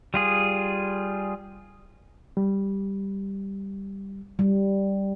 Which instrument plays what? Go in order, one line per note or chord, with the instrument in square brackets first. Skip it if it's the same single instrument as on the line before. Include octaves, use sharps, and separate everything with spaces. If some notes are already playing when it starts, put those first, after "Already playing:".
[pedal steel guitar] G3 F4 G#4
[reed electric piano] G3
[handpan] G3